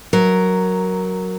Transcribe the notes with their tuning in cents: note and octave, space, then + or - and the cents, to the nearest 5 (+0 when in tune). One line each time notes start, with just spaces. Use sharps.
F#3 +0 A#4 +0